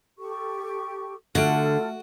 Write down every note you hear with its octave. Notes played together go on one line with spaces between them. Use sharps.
G4 A4 C#6
D3 A3 F4 F#4 A4 E5 F6 D7